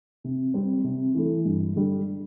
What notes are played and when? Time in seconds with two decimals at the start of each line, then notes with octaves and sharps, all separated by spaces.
0.24 C3
0.54 G3 C4
0.84 C3
1.15 E3 A3
1.45 G2
1.76 D3 G3